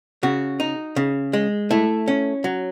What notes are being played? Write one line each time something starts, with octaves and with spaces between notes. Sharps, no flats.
C#3 F#4
D#4
C#3
G#3
A3 E4
C#4
F#3